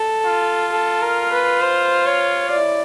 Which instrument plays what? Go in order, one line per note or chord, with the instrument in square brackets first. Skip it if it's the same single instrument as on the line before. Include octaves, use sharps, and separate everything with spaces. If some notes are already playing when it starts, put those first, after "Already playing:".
Already playing: [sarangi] A4
[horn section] F4
[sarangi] A4
A#4
B4
C5
C#5
[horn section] E4 [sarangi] D5